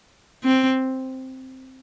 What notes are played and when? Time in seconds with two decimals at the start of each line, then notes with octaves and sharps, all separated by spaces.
0.44 C4